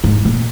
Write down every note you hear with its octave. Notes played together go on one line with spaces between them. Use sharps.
G#2
A#2